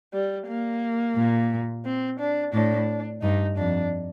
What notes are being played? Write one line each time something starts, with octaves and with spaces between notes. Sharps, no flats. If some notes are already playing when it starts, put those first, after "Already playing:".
G3
A#3
A#2
C4
D4
A2 D4
G2 D#4
F2 D4